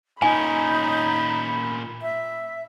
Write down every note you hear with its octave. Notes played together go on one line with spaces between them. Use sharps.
A#2 C#4 D#4 G#5 B5
E5